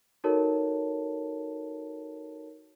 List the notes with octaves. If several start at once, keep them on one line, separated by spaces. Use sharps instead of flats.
D#4 F#4 A4 A#4 C#5 A5